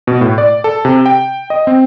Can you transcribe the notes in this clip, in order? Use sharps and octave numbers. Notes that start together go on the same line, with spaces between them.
B2
A2
D5
A4
C3
G5
D#5
C4